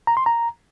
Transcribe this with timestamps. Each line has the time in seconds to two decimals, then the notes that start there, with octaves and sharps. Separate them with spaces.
0.07 A#5
0.17 C6
0.26 A#5